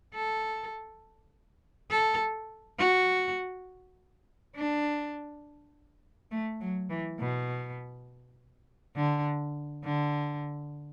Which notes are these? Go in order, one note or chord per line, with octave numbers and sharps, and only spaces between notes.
A4
A4
F#4
D4
A3
F#3
E3
B2
D3
D3